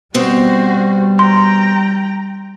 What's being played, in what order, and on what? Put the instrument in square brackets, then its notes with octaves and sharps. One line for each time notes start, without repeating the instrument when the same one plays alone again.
[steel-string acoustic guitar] B2 C4 [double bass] G3 [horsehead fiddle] F#4 C5
[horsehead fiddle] G5 A#5 [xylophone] C6